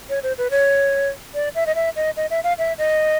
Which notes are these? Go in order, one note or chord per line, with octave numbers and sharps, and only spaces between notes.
C#5
C5
B4
C#5
D5
E5
D#5
E5
D#5
D#5
E5
F5
E5
D#5